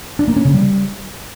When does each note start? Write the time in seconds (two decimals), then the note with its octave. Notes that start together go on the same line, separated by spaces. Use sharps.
0.19 D4
0.28 A#3
0.36 C#4
0.45 C#3
0.54 G3